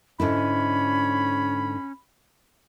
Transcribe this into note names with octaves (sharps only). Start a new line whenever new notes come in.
G#2 D3 C#4 E4 B5